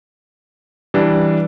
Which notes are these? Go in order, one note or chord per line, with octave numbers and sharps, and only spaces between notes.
E3 G3 D4